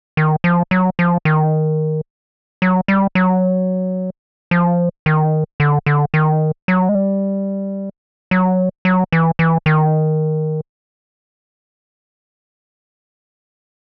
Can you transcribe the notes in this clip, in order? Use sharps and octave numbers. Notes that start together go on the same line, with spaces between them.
D#3
F3
F#3
F3
D#3
F#3
G3
F#3
F3
D#3
D3
D3
D#3
F#3
G#3
G3
F#3
F#3
E3
E3
D#3